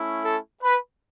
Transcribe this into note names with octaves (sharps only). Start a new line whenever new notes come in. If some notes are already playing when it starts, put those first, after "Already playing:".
Already playing: A3 C#4 E4
A4
B4